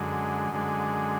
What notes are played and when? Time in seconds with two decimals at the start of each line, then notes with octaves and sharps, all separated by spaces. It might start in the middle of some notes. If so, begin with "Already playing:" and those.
Already playing: F#2 D3 G#3
0.52 F#2 D3 G#3